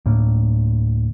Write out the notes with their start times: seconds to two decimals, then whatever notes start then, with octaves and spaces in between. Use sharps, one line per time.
0.06 D2 A2 A#3